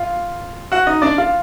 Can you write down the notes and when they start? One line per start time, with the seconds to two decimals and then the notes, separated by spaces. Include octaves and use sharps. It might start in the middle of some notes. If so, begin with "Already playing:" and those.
Already playing: F4 F5
0.72 F#4 F#5
0.87 D#4 D#5
1.02 D4 D5
1.18 F4 F5